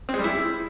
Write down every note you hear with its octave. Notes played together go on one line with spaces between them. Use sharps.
C4
G#3
G3
E4